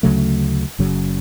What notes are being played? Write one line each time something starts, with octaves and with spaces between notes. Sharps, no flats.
D2 C#3 F#3 A3
F#1 F#2 C#3 F#3